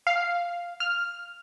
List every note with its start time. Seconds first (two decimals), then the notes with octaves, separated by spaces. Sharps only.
0.07 F5
0.80 F6